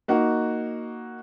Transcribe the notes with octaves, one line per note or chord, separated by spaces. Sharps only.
A#3 D#4 F#4